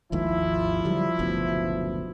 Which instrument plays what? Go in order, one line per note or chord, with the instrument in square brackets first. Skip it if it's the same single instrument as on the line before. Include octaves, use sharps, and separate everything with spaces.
[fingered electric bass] G#1 D#2 G#2 [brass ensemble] F3 E4
[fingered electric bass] D3 F#3 G3
F#1 D2 B2